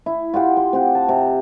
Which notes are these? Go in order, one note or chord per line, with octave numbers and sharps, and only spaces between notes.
E4
F4 G4 F#5 G5
C6
C4 G4 F#5
A5
C3